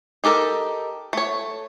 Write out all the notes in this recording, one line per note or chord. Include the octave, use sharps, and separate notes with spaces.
D#4 G4 A4 A#4
A3 C#5